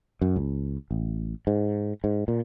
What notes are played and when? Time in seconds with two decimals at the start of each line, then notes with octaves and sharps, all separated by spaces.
0.21 F#2
0.36 C#2
0.91 A1
1.47 G#2
2.04 G#2
2.28 A#2